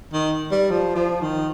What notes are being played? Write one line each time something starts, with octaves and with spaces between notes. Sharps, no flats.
D#3
G3
F3
F3
D#3